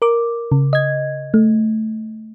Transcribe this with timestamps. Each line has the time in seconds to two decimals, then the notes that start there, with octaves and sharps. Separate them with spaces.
0.02 A#4 D6
0.52 C#3
0.73 D#5 G#6
1.34 A3